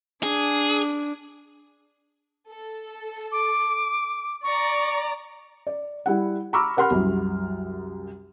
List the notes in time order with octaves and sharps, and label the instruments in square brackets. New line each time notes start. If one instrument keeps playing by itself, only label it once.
[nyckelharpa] D4 [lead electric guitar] G#4
[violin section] A4
[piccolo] D6
[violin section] D5 A#5 [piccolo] C#6
[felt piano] D5
G3 E4 F#5
A#5 B5 C#6 D6 E6 F6
G4 A#4 F#5 B5 C6 F6
C2 F#2